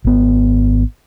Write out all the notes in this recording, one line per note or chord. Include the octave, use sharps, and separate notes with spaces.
G#1 B3